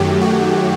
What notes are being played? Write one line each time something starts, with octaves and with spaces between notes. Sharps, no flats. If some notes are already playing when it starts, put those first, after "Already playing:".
Already playing: F#2 D#3 F#3 A3 G4
F#4